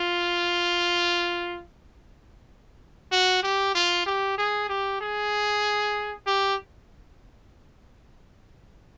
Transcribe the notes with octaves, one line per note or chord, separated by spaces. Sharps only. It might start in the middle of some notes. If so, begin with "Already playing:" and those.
Already playing: F4
F#4
G4
F4
G4
G#4
G4
G#4
G4